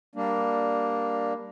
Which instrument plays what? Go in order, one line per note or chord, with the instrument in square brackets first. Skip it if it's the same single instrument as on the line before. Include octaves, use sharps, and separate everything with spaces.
[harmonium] G3 A#3 D4